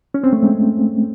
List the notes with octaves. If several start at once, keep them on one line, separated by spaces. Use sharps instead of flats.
C#4
C4
A3
G#3